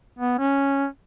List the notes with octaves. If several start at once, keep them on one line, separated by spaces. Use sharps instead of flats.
B3
C#4